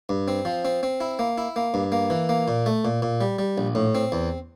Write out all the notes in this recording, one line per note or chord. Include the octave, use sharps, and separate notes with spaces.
G2
C4
F3
C4
C4
E4
A#3
E4
A#3
G2
A#3
E3
A#3
A#2
A3
A#2
A#2
G3
G3
A#1
A2
C4
E2